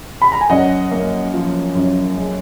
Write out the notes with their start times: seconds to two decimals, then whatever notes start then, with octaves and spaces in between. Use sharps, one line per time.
0.22 B5
0.32 A#5
0.41 G#5
0.49 F#2 D#5 F#5
0.91 A#3
1.34 F3
1.75 F#2
2.17 G#3